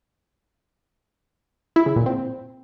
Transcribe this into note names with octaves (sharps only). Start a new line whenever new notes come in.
E4
C#3
A#2
C4